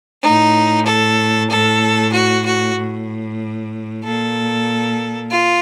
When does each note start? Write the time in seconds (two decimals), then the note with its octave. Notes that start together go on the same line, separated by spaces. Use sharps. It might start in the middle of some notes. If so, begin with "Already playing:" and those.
0.23 A2 D#4
0.87 A4
1.50 A2 A4
2.14 F#4
2.46 F#4
2.78 A2
4.04 A#2 A4
5.32 F4